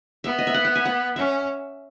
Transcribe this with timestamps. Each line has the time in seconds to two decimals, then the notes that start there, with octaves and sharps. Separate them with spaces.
0.24 B3 E5
0.39 D#5
0.47 E5
0.54 F#5
0.65 F#5
0.75 G#5
0.85 F#5
1.16 C#4 E5